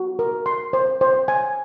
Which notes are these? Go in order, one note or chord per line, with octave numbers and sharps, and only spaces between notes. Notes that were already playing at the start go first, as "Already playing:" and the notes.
Already playing: F#4
A#4
C6
C5
C5
G#5